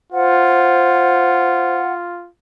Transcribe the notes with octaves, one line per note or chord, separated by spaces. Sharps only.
F4 C5 F#5